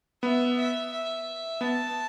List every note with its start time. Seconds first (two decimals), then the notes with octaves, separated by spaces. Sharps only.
0.23 B3 E5
0.58 E5
0.93 E5
1.61 B3 A5